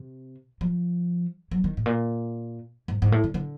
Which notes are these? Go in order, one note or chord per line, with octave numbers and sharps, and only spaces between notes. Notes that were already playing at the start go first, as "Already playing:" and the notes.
Already playing: C3
F3
F#3
D#3
A2
A#2
G#2
G#2
A2
D3
D3